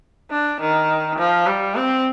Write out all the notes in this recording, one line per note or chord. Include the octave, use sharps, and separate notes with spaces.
D4
D#3
F3
G3
C4